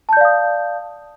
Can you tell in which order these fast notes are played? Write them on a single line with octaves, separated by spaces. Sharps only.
A5 G6 D5 F5 D#6